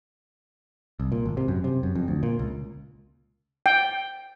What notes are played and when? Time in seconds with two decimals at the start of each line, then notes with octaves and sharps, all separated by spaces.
1.00 C2
1.12 A#2
1.26 G#1
1.37 C3
1.48 F#2
1.64 C3
1.83 F#2
1.95 F2
2.08 D2
2.23 A#2
2.39 C#2
3.66 G5